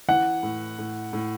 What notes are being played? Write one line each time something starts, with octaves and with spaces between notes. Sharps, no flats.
E3 F#5
A2
A2
A2